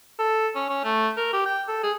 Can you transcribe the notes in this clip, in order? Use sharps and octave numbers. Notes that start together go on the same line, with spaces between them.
A4
C#4
C#4
A3
A#4
G4
G5
A4
G#4